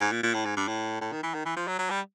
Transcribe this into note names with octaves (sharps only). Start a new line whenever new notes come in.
G#2
A#2
A#2
A2
G#2
G2
A2
A2
D#3
E3
D#3
E3
F3
F#3
F#3
G3